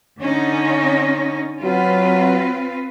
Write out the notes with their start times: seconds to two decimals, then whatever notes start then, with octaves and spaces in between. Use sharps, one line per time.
0.20 D3 C#4 D#4
1.63 F#3 C4 F4 B4